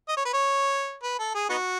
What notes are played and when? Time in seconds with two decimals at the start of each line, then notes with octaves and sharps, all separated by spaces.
0.08 D#5
0.17 C#5
0.25 B4
0.33 C#5
1.03 B4
1.19 A4
1.35 G#4
1.50 B3 D#4 F#4